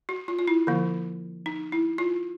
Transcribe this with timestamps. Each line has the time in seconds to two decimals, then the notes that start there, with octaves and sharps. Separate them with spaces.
0.09 F#4
0.28 F4
0.39 F4
0.48 E4
0.67 D3 F3 A#3
1.46 D#4
1.72 E4
1.98 F4